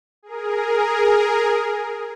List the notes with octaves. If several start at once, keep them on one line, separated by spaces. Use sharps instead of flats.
G#4 A#4